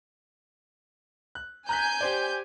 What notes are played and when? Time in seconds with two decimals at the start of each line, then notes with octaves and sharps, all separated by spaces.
1.35 F#6
1.69 G#5 A#5 F#6 G6 B6
2.01 G4 C5 D5